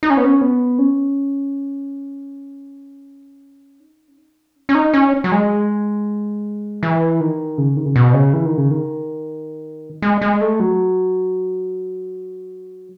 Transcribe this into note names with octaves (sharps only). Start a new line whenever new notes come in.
D#4
C#4
B3
C#4
B3
C#4
D#4
C#4
D#4
C#4
C#4
D#4
C#4
F#3
G#3
E3
D#3
C#3
D#3
C#3
B2
C#3
E3
D#3
C#3
D#3
G#3
G#3
A3
F#3